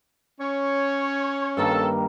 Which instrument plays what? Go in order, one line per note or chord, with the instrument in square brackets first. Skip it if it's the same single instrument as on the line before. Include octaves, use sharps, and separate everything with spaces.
[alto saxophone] C#4 [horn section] C#5
[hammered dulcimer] G2 D#3 A#3 [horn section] A4